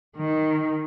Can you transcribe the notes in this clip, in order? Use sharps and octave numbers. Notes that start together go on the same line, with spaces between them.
D#3